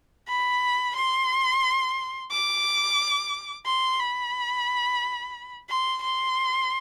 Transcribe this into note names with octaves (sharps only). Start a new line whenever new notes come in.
B5
C6
D6
C6
B5
C6
C6